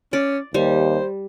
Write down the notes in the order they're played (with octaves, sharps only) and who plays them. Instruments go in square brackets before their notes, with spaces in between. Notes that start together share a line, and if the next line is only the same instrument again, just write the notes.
[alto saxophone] C#4 [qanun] D5
[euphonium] D#2 [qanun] G3 [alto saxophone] C5